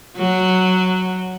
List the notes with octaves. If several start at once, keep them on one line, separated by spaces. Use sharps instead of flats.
F#3